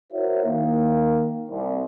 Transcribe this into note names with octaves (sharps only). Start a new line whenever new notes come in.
E4 F#4 A#4 C5 C#5 E5
D#3 A#3
C2